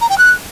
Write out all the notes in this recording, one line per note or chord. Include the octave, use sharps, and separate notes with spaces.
A#5
G5
F#6